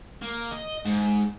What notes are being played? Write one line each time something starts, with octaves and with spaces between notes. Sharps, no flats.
A#3
D#5
G#2